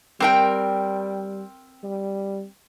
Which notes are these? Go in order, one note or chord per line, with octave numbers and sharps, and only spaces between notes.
G3 C4 A#4 G5
G3